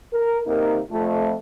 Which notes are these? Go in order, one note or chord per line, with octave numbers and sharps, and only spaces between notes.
A#4
C3 D#3 A#3 D#4 A#4
F2 A3